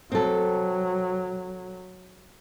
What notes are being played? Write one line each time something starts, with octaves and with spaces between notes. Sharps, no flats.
F#3 C4 A4